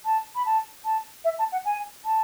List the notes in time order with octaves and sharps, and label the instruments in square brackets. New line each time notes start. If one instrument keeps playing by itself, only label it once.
[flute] A5
B5
A5
A5
E5
A5
F#5
G#5
A5